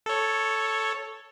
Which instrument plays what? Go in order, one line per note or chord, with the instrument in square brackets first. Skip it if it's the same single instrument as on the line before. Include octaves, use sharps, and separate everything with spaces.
[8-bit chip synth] A4 C#5